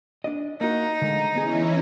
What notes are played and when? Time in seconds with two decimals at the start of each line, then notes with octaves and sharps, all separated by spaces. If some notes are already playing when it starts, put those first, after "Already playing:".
0.24 D4 D5 D#5
0.61 A#3 D#4 F#4
1.02 D3 G#3 A3
1.35 E3 B3 C#4 E4 G#4